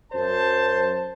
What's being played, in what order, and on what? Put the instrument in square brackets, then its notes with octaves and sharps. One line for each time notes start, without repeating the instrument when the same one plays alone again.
[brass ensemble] F#2 C5 A5